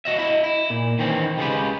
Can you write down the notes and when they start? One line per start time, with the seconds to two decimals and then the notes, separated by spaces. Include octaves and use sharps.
0.05 F#4 D#5 E5
0.19 E4 D#5 E5
0.44 E4
0.70 A#2
0.99 D#3 E3 C4 C#4
1.37 C#2 C#3 G#3 F4 G4 B4